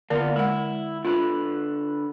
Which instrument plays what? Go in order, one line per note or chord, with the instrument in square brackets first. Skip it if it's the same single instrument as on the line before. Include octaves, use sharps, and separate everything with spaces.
[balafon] D3 D5 [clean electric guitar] A#3 B3 F4
[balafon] G#3 F#5 [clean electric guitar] E4
[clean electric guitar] D3 B4 [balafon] F4